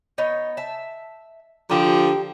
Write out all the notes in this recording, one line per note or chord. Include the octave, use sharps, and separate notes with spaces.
B3 D#4 C#5
E5 A5
D3 F3 G4 A#4